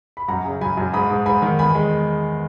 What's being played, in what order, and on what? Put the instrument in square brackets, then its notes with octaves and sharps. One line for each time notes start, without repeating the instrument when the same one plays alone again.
[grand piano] B5
F#2 F#5 A#5
C#3
F#2 G#5 B5
F#2
G#2 B5 D#6
G#2
G#2 G#5 B5
D#3
E2 G#5 B5
G#3